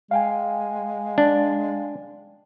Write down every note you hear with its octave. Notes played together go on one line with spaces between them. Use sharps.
G#3 F5 G5 G#5
D4